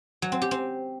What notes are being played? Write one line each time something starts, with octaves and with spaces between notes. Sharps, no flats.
F#3
C4
G4
C4